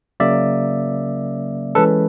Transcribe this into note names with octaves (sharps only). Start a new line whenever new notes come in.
C#3 F#3 A#3 C#4 D5 E5
E3 G#3 C#4 A4 B4